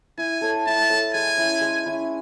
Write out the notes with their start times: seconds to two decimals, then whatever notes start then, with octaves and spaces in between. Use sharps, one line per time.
0.18 E4 G#5
0.41 A4 C#5
0.66 E4 A5
0.90 A4 C#5
1.13 G#3 G#5
1.37 C#4 E4
1.61 G#3
1.86 C#4 E4